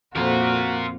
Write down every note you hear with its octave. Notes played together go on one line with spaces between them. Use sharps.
F2 A#2 A#3 F4 F#4 A#4